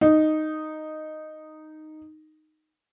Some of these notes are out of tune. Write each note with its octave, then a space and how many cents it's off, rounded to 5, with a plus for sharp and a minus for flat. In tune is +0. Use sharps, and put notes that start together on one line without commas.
D#4 -5